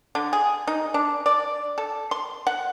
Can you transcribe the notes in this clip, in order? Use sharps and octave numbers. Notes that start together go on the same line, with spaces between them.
D3
G#4
D#4
D4
D5
A4
C6
F#5